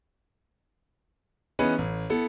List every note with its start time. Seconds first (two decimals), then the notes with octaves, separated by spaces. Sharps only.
1.59 E3 B3 C#4 D#4 G#4 B4
1.78 A1
2.10 B3 E4 A4